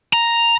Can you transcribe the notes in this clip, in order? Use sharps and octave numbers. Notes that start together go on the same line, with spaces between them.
A#5